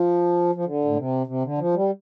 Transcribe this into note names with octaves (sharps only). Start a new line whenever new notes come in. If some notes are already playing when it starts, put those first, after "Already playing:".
Already playing: F3
F3
D3
A2
C3
C3
D3
F3
G3